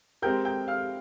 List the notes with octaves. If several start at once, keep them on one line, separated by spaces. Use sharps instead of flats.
G#3 C4 G4 A#4 G5 G6
G5 G6
F5 F6